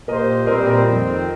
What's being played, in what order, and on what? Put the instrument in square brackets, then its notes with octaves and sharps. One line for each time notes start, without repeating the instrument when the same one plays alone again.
[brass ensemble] A#2 A#3 G4 C5 [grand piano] A#4 D#5
[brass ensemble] A#2 G3 C4 [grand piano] A#4 D#5
[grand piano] A#4
[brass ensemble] F2 D#3 C4